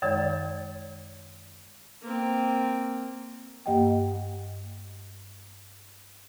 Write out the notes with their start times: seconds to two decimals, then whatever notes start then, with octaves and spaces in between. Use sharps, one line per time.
0.02 F#2 D#3 G#3 C#5 D5
2.02 A#3 C4
3.66 G2 A#3 G4 D#5 F#5 G5